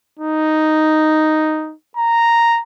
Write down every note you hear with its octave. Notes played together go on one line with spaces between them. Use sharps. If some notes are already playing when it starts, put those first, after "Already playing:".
D#4
A#5